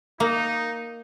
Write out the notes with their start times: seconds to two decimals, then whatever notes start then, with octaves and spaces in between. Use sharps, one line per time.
0.20 A#3 D#4